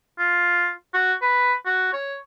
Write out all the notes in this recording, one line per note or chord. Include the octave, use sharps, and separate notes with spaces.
F4
F#4
B4
F#4
C#5